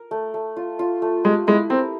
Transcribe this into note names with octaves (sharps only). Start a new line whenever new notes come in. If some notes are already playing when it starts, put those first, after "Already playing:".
Already playing: A#4
A3
A3
F4
F4
A3
G#3 G4
G#3 E4
C4 A#4